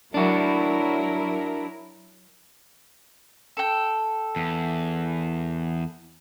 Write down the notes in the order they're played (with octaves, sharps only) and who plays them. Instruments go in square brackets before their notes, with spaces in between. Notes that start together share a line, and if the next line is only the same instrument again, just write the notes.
[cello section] F#3 E4 A#4 [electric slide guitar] D4 F#4
[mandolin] A4 G5
[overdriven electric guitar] E2